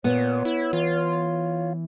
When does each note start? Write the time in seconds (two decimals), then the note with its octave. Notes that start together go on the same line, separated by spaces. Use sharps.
0.04 A#2 B3 C#5
0.45 E4
0.73 E3 F4